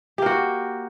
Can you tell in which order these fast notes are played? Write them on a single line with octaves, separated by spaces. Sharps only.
G4 A#3 F#4